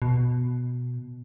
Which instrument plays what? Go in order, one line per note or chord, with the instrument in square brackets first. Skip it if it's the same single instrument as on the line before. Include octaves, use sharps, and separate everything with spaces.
[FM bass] B2